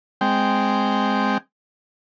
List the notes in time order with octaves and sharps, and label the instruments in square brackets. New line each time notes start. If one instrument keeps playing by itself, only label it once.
[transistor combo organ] G#3 C4 G5